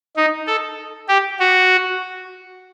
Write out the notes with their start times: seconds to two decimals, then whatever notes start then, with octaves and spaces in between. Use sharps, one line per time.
0.16 D#4
0.47 A4
1.09 G4
1.39 F#4